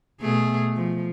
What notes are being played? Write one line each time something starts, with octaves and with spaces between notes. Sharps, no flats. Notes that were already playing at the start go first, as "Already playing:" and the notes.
B2 A3 G#4
F3